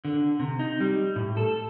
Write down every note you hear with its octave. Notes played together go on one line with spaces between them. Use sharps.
D3
C3
D#4
G3
A2
A4